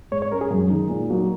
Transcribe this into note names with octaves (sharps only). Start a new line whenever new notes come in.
G#2 C#5
C#5
G#3 C#4 A#4
G#4
F#2
D#3 G#3 D#4
A#2
F#3 A#3 D#4